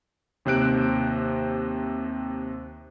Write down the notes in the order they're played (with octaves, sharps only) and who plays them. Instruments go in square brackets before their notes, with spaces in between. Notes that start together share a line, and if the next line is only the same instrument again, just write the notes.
[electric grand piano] D#2 C3 C5 F#6 D7